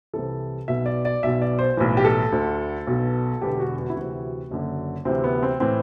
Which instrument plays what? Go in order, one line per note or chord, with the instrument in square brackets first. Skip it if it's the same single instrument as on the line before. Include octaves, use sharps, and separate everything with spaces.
[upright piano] C2 C3 E3 A4
B1 B2 E5
D5
D5
B1 B2 E5
D5
C5
B1 A2 E3
G4
A4
D2 D3
B1 B2
E1 E2 D3 G4
F#4
F#4
E4
D2 C3 E3 F#4
F#1 F#2 D3
D2 C3 E3 C4
B3
C4
A2 E3 C4